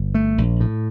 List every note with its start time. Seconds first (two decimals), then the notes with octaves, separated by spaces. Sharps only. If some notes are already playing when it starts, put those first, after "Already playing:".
Already playing: G1
0.14 A3
0.38 A#1
0.60 A2